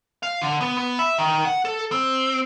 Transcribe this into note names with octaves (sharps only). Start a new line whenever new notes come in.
F5
D3
B3
B3
E5
D#3
F#5
A4
C4